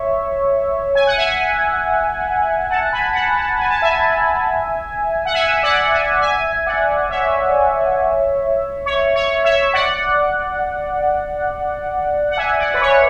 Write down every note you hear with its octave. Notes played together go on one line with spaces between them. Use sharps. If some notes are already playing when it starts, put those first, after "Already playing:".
Already playing: C#5 E5
G#5
F#5
E5 G#5
F#5 A5
G#5 B5
F#5 A5
F#5 A5
G#5
A5
E5 G#5
F#5
E5 G#5
D5 F#5
E5 G#5
E5 G#5
D5 F#5
C#5 E5
C#5
C#5
C#5 E5
D5 F#5
F#5
E5 G#5
D5 F#5
B4
C#5